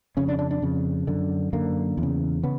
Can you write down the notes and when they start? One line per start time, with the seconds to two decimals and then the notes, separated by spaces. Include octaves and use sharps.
0.17 F2 C#3 C#4
0.28 D4
0.39 D4
0.51 D4
0.62 F2 C#3
1.07 F#2 D3
1.53 F#2 D3 A#3
1.98 E2
2.03 C#3
2.43 C#3 B3